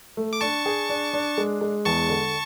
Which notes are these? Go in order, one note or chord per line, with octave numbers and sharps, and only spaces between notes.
A3
D6
D4 A5 C#6
G#4
D4
D4
G#3
G#3
E2 A5 C#6
D3